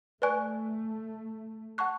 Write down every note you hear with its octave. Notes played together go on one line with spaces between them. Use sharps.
A3 B4 D5 G#5 C#6 F#6
F#5 A5 C#6 F#6